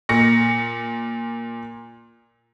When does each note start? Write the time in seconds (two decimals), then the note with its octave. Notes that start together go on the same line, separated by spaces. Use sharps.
0.09 A#2 A#6 C#7